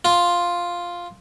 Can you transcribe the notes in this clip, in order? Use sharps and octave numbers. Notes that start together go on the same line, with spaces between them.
F4